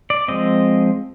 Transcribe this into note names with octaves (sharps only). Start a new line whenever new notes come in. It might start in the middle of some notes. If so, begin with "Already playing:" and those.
D5
F3 G#3 C4 D#5